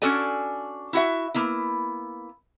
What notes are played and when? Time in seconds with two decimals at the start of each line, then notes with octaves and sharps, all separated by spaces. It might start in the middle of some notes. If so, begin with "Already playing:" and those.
0.02 C#4 D4 F#4 A4 D5 G#5
0.93 E4 F#4 E5
1.34 A#3 B3 E4